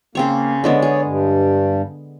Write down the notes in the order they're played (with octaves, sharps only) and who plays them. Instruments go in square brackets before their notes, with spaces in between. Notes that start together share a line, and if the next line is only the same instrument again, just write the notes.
[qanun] C#3 C4 C#5 [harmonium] A#3
[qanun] D3 G#3 B3 [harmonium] C#5 D5
[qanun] G#4
[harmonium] G2